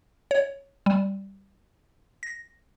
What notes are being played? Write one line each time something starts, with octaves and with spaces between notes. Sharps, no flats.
C#5
G3
A#6